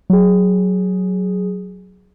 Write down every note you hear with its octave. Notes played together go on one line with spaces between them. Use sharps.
F#3 G#4